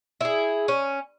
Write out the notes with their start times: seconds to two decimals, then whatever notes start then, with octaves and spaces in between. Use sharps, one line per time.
0.21 E4 G#4
0.68 C#4